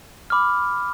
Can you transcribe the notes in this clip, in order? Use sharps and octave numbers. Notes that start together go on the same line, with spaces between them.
B5 D6 F6